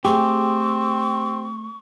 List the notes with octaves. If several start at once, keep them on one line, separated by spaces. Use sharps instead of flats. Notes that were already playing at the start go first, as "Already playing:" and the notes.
A3 C4 G4 G#4 C#6